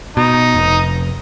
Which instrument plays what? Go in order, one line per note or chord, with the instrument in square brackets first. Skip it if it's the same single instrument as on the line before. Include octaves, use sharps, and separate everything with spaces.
[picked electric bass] B2 [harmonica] D#4
[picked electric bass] F1